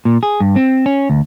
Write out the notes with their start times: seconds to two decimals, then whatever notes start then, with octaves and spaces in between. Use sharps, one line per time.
0.05 A#2
0.23 G#4
0.40 G2
0.56 C4
0.86 C#4
1.10 D2